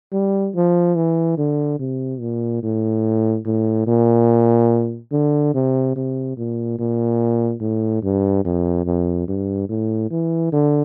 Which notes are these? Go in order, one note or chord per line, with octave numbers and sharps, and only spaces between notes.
G3
F3
E3
D3
C3
A#2
A2
A2
A#2
D3
C3
C3
A#2
A#2
A2
G2
F2
F2
G2
A2
E3
D3